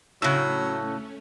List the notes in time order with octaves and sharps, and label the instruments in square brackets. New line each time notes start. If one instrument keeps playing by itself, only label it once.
[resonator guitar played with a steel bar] A2 C#3 [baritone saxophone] F#3 [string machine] A3 C#4 [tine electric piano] E6 F#6